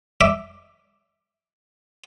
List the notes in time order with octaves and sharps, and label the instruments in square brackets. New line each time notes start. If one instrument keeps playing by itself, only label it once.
[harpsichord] E5 D6